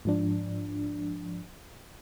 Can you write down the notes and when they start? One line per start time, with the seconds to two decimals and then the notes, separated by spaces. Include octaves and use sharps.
0.05 G#2 F3 D4